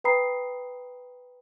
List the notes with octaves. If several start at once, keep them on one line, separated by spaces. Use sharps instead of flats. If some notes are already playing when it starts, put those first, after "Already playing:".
B4 G5 A#5 B5 D#6 C7